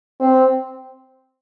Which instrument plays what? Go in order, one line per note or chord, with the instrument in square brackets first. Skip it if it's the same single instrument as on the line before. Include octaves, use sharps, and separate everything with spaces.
[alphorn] C4